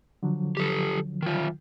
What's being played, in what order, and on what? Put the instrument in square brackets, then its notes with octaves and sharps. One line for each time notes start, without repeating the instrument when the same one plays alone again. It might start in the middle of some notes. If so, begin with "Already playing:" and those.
[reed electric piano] D3 F3 F#3
[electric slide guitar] G4 A4
D#3 F4